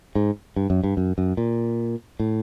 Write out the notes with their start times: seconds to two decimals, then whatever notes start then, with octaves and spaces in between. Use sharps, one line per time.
0.15 G#2
0.56 G2
0.70 F#2
0.84 G2
0.97 F#2
1.18 F#2
1.37 A#2
2.20 A2